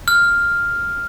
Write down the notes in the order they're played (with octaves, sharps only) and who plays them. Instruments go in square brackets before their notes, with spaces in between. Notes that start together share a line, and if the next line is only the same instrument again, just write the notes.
[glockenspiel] F6